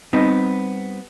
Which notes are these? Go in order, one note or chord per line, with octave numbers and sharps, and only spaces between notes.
G3 B3 C4 D#4 B4